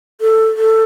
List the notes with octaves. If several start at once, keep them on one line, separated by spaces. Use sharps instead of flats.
A4
A4